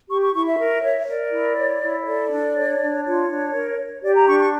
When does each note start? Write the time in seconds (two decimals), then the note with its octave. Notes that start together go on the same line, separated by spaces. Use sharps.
0.10 G4 C#6
0.22 C#6
0.35 E4 C#6
0.47 E5
0.59 A#4
0.84 C#5
1.08 A#4 D5
1.33 E4
1.57 C#5
1.82 E4
2.06 A4 D5
2.31 D4
2.56 C#5
2.80 D4
3.05 F4 C#5
3.29 D4
3.54 A#4
3.78 C#5
4.02 G4 D5
4.15 A#5
4.27 D4 C#6
4.40 C#6